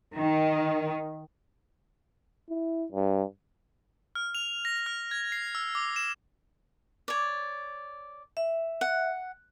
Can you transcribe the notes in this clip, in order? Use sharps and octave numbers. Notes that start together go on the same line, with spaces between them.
D#3
E4
G2
F6
F7
A#6
F6
G#6
C7
E6
D6
E7
C#5 D5
E5
F#5